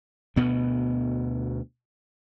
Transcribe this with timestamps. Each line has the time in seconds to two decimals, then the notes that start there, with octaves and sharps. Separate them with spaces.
0.36 D2 B2 B3